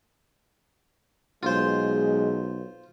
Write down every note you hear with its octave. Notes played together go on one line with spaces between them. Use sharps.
B1 G#3 F4 C5